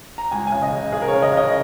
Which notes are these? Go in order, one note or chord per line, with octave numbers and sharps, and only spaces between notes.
A#5
C#2 G#5
G#5
C#3
D#5
C#3
C#3 G#4
A#4
C#5
C#3
D#5
C#3 D#5